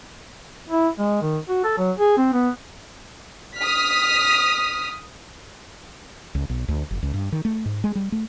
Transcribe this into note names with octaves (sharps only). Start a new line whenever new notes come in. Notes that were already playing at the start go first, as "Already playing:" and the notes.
E4
G#3
D#3
F#4
A4
F#3
G#4
C4
B3
D#6 F6 B6
C#2
B1
D2
F#1
C#2
G2
D#3
A3
G#2
G#3
G3
A3